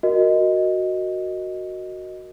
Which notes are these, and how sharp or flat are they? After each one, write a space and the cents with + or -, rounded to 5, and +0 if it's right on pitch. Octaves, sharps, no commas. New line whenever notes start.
F#4 +0 A#4 +0 D#5 +0